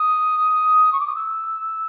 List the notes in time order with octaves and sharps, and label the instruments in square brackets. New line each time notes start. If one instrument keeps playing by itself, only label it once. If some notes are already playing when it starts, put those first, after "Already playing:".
Already playing: [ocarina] D#6
C#6
D6
D#6
E6